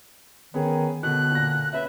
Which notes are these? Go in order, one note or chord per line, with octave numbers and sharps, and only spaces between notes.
D#3 B3 C#4 G#4
B2 D3 F#6
A#2 A#6
C#4 B4 E5